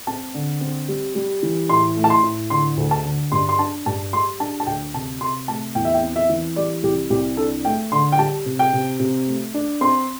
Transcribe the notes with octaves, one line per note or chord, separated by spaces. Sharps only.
C4 A5
D3
C4
G3
G3
E3
A2 C6
A3
A5
C6
A2
D3 C6
D2
A5
D3
G2 C6
C6
D4 A5
G2 A5
G3 C6
D4 A5
A5
D2 G5
C3 A5
C3 C6
A3 A5
E2 G5
E5
G5
C4
E5
E3
G3 D5
C2 G4
C2 G4
D4 A4
A3 G5
D3 C6
G5
G3 A5
C3
G5
C3
C3
A3
D4
C4 C6